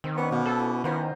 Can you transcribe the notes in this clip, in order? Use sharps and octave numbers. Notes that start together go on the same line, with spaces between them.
D#3 C4
B3 C#4 D5 C#6
B2 F#4 F5
A4
E3
D#3 B3 F4 C5 A#5